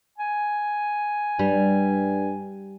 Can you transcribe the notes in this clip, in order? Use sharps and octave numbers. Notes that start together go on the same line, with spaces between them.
G#5
G2 G3